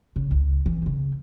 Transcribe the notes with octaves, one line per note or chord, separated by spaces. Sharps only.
C#3
C#2
E3
C#3 A#3